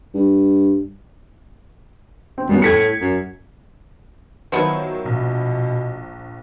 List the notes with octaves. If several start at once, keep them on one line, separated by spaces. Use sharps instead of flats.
G2
C4
F#2 G3 B3
A2 G#6 B6 C#7
F#2
D#3 F3 F#3 B3 E4
A#1 B2